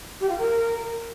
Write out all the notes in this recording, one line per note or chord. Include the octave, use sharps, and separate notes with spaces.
G4
F4
A#4